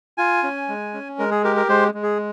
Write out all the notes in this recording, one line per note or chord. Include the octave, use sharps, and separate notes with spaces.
F4 G#5
C#4
G#3
C#4
G#3 A#4
G#4
G4 A#4
A#4
G#3 C5
G#3
G#4